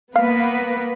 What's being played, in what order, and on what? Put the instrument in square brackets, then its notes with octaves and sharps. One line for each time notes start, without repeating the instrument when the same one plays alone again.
[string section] A#3 B3 B4 [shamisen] F5